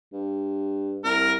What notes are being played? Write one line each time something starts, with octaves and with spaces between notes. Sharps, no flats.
G2
C2 A#4